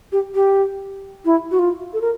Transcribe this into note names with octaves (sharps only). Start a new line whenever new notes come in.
G4
G4
E4
F#4
F4
A4
A#4